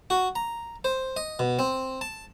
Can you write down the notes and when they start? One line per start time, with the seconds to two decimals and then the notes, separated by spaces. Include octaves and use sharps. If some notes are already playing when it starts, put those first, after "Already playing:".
0.10 F#4
0.36 A#5
0.84 C5
1.17 D#5
1.39 B2
1.59 C4
2.01 A5